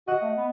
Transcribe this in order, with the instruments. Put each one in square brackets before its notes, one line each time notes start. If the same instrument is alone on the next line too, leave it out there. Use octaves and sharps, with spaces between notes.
[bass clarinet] F#4 [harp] D#5 F#5
[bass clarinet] A3
B3